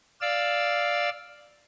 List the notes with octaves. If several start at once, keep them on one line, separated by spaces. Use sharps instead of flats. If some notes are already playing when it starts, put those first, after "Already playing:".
D5 F5 E6